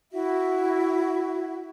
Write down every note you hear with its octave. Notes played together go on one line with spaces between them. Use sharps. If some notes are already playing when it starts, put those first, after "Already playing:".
E4 F#4 E5